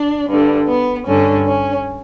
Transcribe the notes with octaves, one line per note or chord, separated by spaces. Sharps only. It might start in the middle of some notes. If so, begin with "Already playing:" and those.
Already playing: D4
G2 D3
B3
G2 D3 C#4
C#4